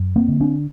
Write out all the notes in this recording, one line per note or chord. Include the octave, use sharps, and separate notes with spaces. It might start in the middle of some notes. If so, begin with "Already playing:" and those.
Already playing: F#2
A#3 C4
D3
C4 D4